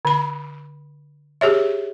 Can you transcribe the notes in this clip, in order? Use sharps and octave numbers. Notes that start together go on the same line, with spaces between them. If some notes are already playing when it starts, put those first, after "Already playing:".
D3 B5
G4 G#4 C#5 E5